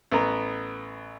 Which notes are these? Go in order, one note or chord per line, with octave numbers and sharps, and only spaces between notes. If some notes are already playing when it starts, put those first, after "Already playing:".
A1 B3 A#5